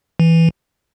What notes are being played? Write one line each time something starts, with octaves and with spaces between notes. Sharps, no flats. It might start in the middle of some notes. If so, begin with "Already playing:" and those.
E3